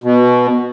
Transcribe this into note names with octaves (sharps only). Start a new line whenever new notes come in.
B2